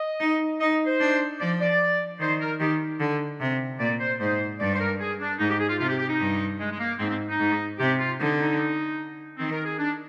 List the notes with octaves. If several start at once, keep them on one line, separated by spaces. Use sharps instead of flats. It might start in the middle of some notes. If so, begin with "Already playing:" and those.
Already playing: D#5
D#4
D#4 D#5
C5
D4
F3 D5
D5
D#3 C5
A#4
D#3 G4
D3
C3
A#2 D5
C5
G#2 C5
G2 D5
C5
A#4
G#4
D4
G#2 D#4
G4
G#4
F4
C3 F4
G4
G4
D#4
G2
G#3
G#3
A#3
G#2 C4
C4
D#4
G#2
C3 G4
F4
D3 D#4
D#4
D#3 C4
A#4
G#4
D4